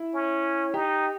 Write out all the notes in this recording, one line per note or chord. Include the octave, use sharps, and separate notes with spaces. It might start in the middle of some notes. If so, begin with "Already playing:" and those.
Already playing: E4
C#4
D#4 G4